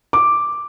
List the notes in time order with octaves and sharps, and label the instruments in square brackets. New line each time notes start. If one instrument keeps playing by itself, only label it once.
[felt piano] D6